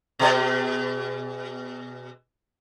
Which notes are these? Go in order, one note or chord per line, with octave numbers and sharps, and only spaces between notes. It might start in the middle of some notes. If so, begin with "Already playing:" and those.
B2 G#4 D5